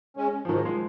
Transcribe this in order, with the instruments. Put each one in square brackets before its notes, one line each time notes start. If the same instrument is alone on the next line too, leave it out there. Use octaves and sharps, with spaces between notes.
[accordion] G#3 C#4
[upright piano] F3
[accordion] G#2 [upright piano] D#3 F#3
[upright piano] F3 G#3